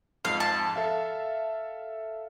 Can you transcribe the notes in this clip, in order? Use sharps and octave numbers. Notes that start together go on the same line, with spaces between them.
F2 G#2 F5
A5
A4 E5 F5